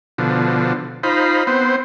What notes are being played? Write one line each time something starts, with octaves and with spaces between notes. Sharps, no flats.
B2 D3 F3
D#4 F4 C5 B5
B3 C4 C5